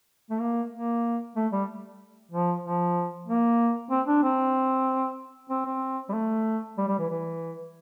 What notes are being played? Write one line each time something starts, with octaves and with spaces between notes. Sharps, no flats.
A3
A#3
A#3
A3
G3
F3
F3
A#3
C4
D4
C4
C4
C4
G3
A3
G3
G3
E3
E3